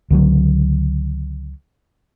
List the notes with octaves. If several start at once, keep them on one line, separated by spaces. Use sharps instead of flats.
C#2 D3 D#3 F#3